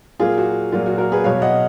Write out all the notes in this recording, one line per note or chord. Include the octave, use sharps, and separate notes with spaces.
A#2 F#3 A#3 F4 G#4
F#4
A#2 F#3 A#3 F4
F#4
F#4 A#4
G#4 B4
B2 F#3 B3 C#5 F5
D#5 F#5